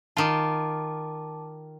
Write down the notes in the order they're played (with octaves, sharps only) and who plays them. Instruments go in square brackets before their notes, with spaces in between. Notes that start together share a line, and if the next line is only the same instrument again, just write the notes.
[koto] D#3 F4 [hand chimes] A5 D6